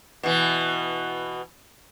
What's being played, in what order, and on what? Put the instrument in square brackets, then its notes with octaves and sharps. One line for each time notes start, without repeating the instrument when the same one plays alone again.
[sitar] B2 E3